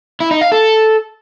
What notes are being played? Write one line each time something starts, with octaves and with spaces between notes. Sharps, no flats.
E4
D#4
F5
A4